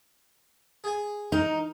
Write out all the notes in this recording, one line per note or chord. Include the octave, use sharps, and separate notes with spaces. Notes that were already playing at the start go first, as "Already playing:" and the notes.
G#4 G#5
D#4 A#4